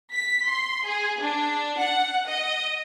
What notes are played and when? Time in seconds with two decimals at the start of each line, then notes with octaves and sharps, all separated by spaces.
0.14 B6
0.48 C6
0.86 G#4
1.21 D4
1.79 F#5
2.28 D#5